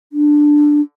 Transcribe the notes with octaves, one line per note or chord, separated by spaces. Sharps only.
D4